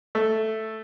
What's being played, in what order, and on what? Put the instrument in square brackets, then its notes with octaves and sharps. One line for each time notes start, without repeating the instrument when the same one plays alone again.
[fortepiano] A3